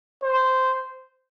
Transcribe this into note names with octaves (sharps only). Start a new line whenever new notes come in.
C5